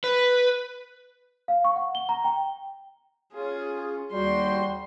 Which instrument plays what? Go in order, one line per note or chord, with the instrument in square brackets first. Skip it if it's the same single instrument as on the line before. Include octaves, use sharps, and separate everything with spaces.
[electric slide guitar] B4
[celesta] F5
C#6
F#5
G7
A#5
G5
[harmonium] C#4 F4 [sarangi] G#4
[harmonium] D#2 F#4 G5 [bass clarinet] G3 [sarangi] C6